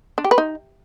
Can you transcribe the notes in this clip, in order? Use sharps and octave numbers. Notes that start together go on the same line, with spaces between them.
D4
G4
B4
D#4